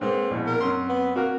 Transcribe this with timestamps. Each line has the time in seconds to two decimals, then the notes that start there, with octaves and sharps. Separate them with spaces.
0.01 G#2 A#3 C4 B4
0.31 A#1 B2 E4
0.47 A#4
0.60 F#2 C4 C6
0.89 B3
1.16 A#3 F#4 A#4